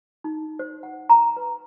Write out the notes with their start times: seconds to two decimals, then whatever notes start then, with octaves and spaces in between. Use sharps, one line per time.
0.24 D#4
0.59 C5
0.83 F#5
1.10 A#5
1.37 B4